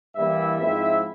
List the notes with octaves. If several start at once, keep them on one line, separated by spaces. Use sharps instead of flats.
G2 E3 G3 A#3 E4 E5
G#2 F3 C4 E4 E5